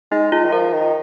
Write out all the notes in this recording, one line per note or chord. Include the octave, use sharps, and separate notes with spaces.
G#3 D#4
G#3 F4
D#3
F3 A#4
D#3